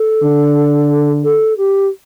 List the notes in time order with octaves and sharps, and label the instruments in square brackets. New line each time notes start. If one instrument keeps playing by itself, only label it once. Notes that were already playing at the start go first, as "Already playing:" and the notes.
Already playing: [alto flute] A4
[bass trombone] D3
[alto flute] A4
G4